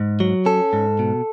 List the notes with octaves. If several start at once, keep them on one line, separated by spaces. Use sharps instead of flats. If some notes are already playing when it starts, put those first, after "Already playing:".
Already playing: G#2
F#3
C#4 A4
G#2
B2